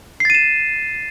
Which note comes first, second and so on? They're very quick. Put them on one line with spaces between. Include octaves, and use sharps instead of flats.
C7 A6 D#7 E7